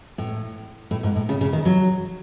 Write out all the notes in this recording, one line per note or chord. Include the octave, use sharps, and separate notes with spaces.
A2
A2
G#2
A2
C#3
C#3
D#3
F#3